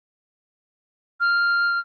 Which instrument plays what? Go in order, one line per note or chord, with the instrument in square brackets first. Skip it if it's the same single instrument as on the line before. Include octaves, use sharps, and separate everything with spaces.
[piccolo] F6